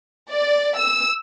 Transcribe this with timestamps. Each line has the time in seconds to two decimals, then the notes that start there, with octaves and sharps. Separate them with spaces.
0.29 D5
0.77 E6